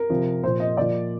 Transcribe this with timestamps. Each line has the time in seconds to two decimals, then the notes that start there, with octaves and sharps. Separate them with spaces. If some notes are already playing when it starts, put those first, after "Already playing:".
Already playing: A#4
0.10 C3 F3
0.43 A#2 F3 C5
0.60 D#5
0.77 A#2 F3 D5